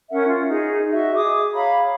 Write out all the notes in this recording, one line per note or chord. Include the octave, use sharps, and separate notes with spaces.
C#4 A#4 E5 F#5
F4
D#4 G#4
F#4 D#5 E5
G#4 D6 D#6
C#5 F5 A#5 B5